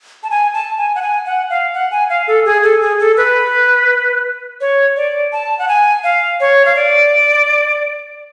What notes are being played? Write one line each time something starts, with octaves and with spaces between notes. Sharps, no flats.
A5
G#5
A5
G#5
F#5
G#5
F#5
F5
F#5
G#5
F5
A4
G#4
A4
G#4
A4
B4
C#5
D5
A5
F#5
G#5
F5
C#5
F5
D5